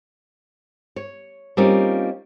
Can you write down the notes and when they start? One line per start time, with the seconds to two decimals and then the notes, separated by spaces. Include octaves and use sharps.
0.96 C#5
1.57 G3 A#3 C4 C#4 D#4 F4